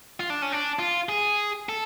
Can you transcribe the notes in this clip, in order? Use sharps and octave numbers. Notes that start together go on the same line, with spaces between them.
F4
D4
C#4
D4
F4
G#4
A4